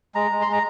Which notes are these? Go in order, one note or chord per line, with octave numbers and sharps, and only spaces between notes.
G#3 A#5
G#3
C6
G#3
A#5